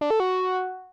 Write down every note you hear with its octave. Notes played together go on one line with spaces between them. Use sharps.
D4
A4
F#4